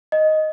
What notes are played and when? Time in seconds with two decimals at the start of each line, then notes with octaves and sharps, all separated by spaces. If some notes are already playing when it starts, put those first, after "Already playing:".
0.12 D#5